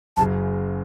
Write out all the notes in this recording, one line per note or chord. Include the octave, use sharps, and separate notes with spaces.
F#1 F#2 C#3 A5